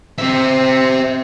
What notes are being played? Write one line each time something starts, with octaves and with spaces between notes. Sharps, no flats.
C4 C5 E5